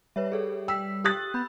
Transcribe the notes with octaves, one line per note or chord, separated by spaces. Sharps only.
G3 B4 C#5 E5
G#4 A4 C#5
G5 E6 B6
G4 D#6 F#6 A6
B3 B5 G6